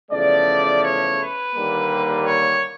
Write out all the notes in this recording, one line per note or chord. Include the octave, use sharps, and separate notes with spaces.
E2 C#3 F3 A3 D5
C#5
B4
D#2 D3 G3 A#3
C#5